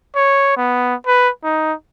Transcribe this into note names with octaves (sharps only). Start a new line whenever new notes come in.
C#5
B3
B4
D#4